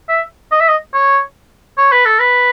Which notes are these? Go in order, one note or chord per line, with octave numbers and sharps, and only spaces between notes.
E5
D#5
E5
D#5
C#5
C#5
B4
A4
B4